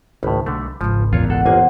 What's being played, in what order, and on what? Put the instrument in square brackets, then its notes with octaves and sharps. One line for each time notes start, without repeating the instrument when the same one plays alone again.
[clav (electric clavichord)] G#1 A2 [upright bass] C#2 [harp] B5
[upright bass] B1 [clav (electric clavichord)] D3 A3
[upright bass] G#1 C#2 [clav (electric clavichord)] F3
[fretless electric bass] E2 [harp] A#2 D4 [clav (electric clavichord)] F4 C#5
[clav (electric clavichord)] A4 [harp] F#5 C7 D7
[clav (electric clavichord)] G1 A#3 G#5 [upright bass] D#3 [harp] C5 F#6